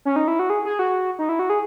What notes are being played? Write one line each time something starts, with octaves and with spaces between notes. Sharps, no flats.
C#4
D#4
E4
F#4
G#4
G#4
F#4
D#4
E4
F#4
G#4